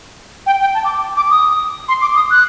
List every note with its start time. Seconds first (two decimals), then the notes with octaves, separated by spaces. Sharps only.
0.46 G5
0.61 G5
0.74 A5
0.84 D6
1.17 D6
1.31 D#6
1.88 C6
2.01 D6
2.16 D#6
2.30 F#6